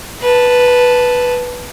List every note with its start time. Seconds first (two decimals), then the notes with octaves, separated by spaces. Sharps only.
0.21 B4 A5